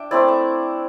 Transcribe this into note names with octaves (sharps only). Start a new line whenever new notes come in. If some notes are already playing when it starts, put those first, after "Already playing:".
Already playing: D4 E5 G5
A3 C4 E4 D5
E5